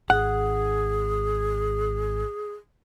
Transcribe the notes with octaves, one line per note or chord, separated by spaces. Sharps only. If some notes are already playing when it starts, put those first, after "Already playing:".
G#1 G#4 F#5